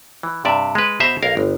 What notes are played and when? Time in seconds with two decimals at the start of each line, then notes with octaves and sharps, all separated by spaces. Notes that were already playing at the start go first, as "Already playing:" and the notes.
0.23 E3
0.45 G2 C3 D5 E5
0.75 G#3 B4
1.00 B2 C5 E5 A#5
1.23 B1 A#4 F5
1.37 G1